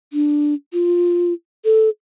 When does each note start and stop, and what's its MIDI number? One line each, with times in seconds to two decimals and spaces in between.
0.13 0.54 62
0.73 1.33 65
1.65 1.89 69